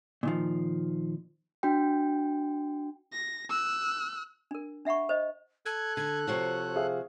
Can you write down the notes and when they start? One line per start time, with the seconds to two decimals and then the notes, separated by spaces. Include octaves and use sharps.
0.23 A#2 D#3 F3
1.63 D4 F#4 G5
3.13 A#6
3.49 E6 F#6
4.51 D4 A#4
4.85 D4 E5 F#5 B5 C#6
5.09 C5 D#5
5.66 A4 F#6 G#6
5.97 D3 G#6
6.27 C3 F3 F#4 C#5
6.76 G#4 E5 F5